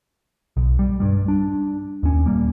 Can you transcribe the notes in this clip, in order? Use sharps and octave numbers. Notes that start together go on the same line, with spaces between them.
B1
G3
G2 G3
D4
D#2 C#4
D#1 C2 G3 A#3